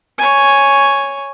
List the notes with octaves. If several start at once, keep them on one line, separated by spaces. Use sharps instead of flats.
C#5 G#5